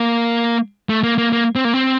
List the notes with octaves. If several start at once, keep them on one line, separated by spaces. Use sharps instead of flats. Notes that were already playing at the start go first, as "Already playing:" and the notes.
Already playing: A#3
A3
A#3
A#3
A#3
C4
A#3
C4